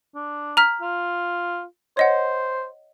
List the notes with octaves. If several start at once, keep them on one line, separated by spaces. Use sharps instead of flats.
D4
A#5 F6 B6
F4
C5 C#5 D#5 F#5